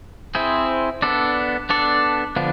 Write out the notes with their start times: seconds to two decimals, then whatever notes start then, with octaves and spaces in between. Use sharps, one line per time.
0.35 C4 E4 G#4 C5
1.02 B3 D4 A4 D5
1.69 B3 D4 A4 D5
2.36 D3 F3 B3 D4